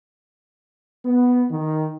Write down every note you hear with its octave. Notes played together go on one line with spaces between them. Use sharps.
B3
D#3